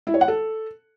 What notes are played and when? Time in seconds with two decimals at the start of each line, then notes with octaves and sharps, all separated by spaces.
0.07 E4
0.14 C#5
0.21 F#5
0.28 A4